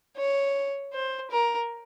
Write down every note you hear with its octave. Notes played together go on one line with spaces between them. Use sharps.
C#5
C5
A#4